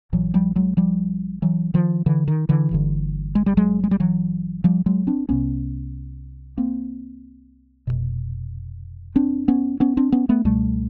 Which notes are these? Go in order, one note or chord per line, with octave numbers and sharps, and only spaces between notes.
A#1 A#2 E3 F#3
F3 G3
F#3 G#3
F3 G3
E3 F#3
D#3 F3
D3 E3
D#3
D3 E3
G1 G2 D3
G#3
G3
F#3 G#3
G#3
G3
E3 F#3
F3 G3
F#3 G#3
C4 D4
C2 C3 B3 C#4
A#3 C4
F1 E2 B2
C4 D4
B3 C#4
B3 C#4
C4 D4
B3 C#4
A3 B3
C#2 B2 G3 A3